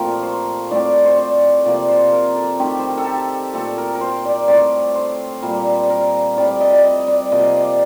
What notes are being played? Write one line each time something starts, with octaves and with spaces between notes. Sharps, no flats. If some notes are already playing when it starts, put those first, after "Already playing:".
Already playing: A#2 F3 A3 C4 F4 G4 A#4
C5
A2 A3 C4 D5
C5
D5
C3 F3 A#3 D5
C5
A#4
A4
D#3 A3 C4 G4
C5
A#4
A4
G4
A#2 A3 C4 A4
A#4
A#4
C5
D5
A2 A3 C4 D5
C5
A#2 G3 A#3 A#4
A#4
A2 G3 C4 D5
D#5
D5
D#5
D5
C3 F3 A#3 D#5
D5